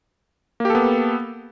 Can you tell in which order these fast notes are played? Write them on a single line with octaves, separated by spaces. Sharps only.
A#3 G4 A4 B3